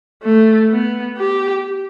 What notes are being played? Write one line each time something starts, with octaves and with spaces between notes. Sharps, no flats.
A3
B3
G4